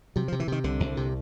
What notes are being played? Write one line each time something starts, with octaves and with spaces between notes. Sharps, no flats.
C3 F#3
C3 F3
E3
C3 D#3
C2 D3
C2
C3